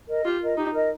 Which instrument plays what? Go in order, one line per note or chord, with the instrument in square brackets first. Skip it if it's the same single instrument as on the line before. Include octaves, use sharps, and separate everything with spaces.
[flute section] A#4 D#5
[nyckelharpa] F4 [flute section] G4
[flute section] A#4 D#5
[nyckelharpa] D#4 [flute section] G4
[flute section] A#4 D#5